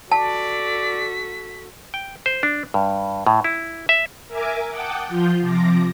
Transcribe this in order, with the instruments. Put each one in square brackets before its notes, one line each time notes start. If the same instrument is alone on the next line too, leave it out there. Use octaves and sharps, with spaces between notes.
[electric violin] F#4 A4 [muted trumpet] D5 [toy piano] A5 [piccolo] B6
[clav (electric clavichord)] G5
C5
D4
G2
A2
E4
E5
[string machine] A#4 E5 G#5 A#5 D6
F#5 G5 A5 D6 D#6
F3 F4 G6
C3 F3 D6 A#6